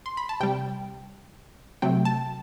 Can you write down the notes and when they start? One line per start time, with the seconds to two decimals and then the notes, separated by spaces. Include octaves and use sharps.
0.06 C6
0.17 B5
0.29 A5
0.40 C3 G3 G5
1.82 C3 F#3 A3 G5
2.05 A5